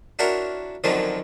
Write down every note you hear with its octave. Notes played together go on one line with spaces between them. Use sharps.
D4 E4 F#4 A#4 C5 C#5
F#2 D3 D#3 F3 F#3 C4